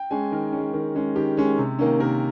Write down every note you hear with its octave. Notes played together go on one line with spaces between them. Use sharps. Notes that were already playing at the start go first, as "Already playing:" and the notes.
Already playing: G5
G#3 C#4 G#5
D#3 A#4
G#3 C#4
D#3
G#3 C#4
D#3 G4
G#3 C#4
C3
D#3 A#3 C#4
C3 A#4